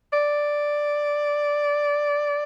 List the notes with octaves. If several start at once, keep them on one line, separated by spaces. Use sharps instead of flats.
D5